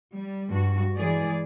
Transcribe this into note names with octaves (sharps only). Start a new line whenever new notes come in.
G3
G2 F#4
E3 G#3 G#4 D5